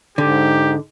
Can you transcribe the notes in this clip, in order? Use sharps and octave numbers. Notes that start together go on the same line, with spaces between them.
G#2 D3 G4